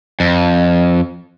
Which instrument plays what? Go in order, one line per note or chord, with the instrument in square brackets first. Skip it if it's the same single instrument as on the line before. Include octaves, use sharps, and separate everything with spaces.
[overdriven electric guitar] F2